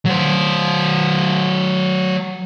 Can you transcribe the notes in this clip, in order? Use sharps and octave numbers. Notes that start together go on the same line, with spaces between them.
F#3 C5